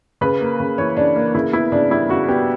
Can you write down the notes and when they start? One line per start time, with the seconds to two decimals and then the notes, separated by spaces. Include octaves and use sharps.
0.21 C#3 B4
0.41 A#3
0.60 C#3
0.78 E3 C#5
0.97 C#3 D4
1.16 A#3
1.35 C#3 E4
1.53 B3 E4
1.72 C#3 D4
1.90 G3 E4
2.09 C#3 F#4
2.28 B3 G4